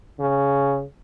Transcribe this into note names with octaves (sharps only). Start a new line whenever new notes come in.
C#3